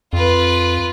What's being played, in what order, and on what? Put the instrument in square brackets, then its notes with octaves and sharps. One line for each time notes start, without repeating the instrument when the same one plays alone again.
[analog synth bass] F2 [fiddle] F4 B4